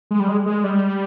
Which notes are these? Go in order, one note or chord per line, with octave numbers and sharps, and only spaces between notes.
G#3
G3
G#3
G#3
G3